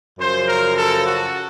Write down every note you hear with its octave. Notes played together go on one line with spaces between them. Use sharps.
F#2 C#3 F3 C5
A#4
A4
F#4